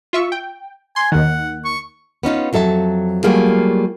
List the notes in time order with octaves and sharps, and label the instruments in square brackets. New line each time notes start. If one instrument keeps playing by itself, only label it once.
[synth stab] F4 E5 C#6
G5
[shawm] G#5 [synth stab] C6
[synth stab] D#2 D#3 [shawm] F#5
[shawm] C#6
[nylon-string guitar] B3 C#4 D#4 F4
F2 F#3 A4 E5 A5
F#3 G3 A3 A#3 F4 G#4